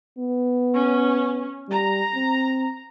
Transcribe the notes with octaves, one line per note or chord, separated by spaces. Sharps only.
B3
C#4
G3 A#5
C4